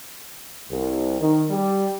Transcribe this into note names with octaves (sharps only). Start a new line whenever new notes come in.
C2
D#3
G3